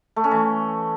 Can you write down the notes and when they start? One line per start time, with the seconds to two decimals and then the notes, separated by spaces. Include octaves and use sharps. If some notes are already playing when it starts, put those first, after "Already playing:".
0.16 A3
0.24 C#4
0.31 E3